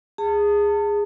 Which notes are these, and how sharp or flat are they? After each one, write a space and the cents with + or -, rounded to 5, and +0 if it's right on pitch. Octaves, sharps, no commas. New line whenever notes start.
G#4 -15 A5 +30